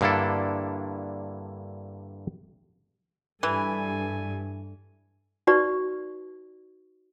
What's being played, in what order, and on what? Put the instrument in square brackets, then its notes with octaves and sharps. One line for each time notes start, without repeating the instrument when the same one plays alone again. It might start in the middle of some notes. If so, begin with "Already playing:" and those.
[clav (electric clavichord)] G2 D3 A#3 D4 E4 A4
[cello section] G2 [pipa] E3 [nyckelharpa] A4 G#5
[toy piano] D#4 F#4 B4 D5 C#6